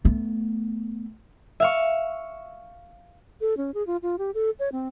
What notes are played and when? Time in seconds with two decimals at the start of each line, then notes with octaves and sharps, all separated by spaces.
0.05 A3 B3
1.60 E5 F5 C#6
3.41 A4
3.57 C#4
3.74 G#4
3.87 F4
4.03 F4
4.19 G4
4.34 A4
4.59 C#5
4.72 C4